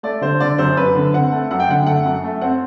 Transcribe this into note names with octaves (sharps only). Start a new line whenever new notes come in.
A3 D5
D3 C5
D3 D5
F#2 C5
F#2 B4
D3
C4 F#5
A3
F#2 F#5
G5
D3 F#5
A3 F#5
F#2
A3
C4 F#5